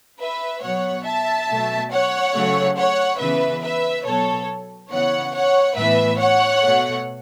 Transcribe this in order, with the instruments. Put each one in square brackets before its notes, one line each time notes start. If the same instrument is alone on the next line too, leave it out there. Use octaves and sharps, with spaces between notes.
[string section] B4 E5
B2 F#3 B3 C#5 F#5
E5 A5
B2 F#3 A3
C#5 F#5
C#3 F#3 A3
C#5 F#5
C#3 E3 B3 B4 E5
B4 E5
B2 F#3 B3 A4 C#5
C#3 E3 B3 C#5 F#5
C#5 F#5
A2 E3 B3 B4 E5
C#5 F#5
B2 A3